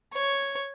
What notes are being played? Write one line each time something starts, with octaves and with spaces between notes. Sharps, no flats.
C#5